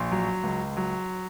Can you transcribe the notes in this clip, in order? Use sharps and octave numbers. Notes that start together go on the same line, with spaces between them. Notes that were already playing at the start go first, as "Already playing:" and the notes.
Already playing: A#1 C6
F#3
C#2
F#3